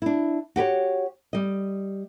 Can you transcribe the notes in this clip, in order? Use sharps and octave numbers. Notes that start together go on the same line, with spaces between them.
D4 E4
F#4 G4 B4 C#5
G3 D#5